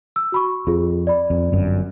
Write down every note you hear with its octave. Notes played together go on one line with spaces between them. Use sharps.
E6
F#4 B5 C#6
F2 F4 G#4
D5 B5
F2
G1 F#2